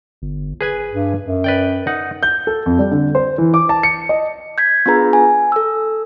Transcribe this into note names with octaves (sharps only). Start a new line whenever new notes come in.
G1
G#4 B4 G#5
G2
F#2
B4 D5 G5
D#4 F#5
G6
A4
F2
G3
D3
C5
E3
D6
A5
C#7
D#5
G6 G#6 B6
B3 D4 F4 G#4 B4 A#5
G#5
A4 E6